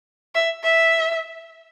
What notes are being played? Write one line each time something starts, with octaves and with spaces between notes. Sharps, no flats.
E5
E5